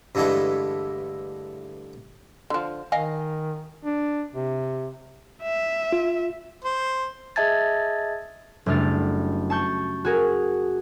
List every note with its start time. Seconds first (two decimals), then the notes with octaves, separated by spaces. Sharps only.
0.15 G2 D3 E3 G#3 A3
2.50 D3 F3
2.92 D#3 D#5 F5 G#5
3.85 D4
4.34 C3
5.42 E5
5.92 F4
6.64 C5
7.36 G#4 D#5 E5 A5 G#6 A6
8.66 F#1 G3 A3 D4 F6 A6
9.50 A5 C#6 G6
10.05 F#4 G#4 A#4